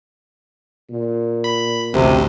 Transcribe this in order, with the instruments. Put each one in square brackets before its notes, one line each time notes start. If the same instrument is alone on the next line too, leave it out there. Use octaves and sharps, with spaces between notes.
[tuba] A#2
[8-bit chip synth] B5
[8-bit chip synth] A1 D2 [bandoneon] C3